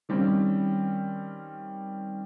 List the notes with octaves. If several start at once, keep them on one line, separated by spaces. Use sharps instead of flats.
D#3 G3 C4 C#4